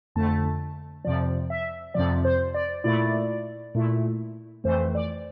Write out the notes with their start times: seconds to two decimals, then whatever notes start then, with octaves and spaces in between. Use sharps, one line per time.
0.15 F2 D3 A3 A5
1.05 F2 C3 F3 D5
1.50 E5
1.94 F2 C3 F3 D5
2.25 C5
2.54 D5
2.84 A#2 A3 E4 D5
3.75 A#2 A3 E4
4.64 F2 E3 A3 C5
4.95 D5